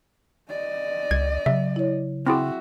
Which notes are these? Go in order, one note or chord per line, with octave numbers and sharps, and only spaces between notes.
D5 D#5
C#2 G#6
C#3 F#3 E5
E4 C#5
C4 E4 F#4 G#4 E5 G5 C6 D6